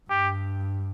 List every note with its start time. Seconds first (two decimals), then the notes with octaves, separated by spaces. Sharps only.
0.10 G2 G4